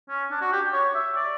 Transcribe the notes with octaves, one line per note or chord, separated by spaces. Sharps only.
C#4
D4
F#4
G4
C#5
E5
D5